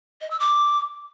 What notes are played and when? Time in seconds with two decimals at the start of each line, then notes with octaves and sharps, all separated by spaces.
0.21 D#5
0.31 E6
0.40 D6